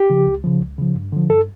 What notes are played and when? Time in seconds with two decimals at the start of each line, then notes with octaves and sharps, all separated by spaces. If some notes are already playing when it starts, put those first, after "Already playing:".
Already playing: G4
0.10 C#3 F3
0.27 C#2
0.44 C#3 F3
0.61 C#2
0.78 C#3 F3
0.95 G2
1.12 D3 F3
1.30 G2 A4